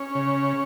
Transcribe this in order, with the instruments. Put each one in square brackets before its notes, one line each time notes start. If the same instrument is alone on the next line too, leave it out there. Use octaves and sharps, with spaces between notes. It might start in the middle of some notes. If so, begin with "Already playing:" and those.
Already playing: [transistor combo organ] C#4
C#3